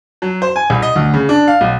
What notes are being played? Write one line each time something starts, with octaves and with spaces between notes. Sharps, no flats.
F#3
C5
G#5
C2
D#5
D2
C#3
D4
F5
B1